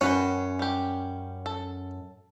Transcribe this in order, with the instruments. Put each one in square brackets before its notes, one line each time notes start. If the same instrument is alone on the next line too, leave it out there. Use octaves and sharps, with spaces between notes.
[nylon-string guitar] F#2 [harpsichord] C#4 [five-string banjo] F#4 B4 G5
[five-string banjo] G3 G4
A4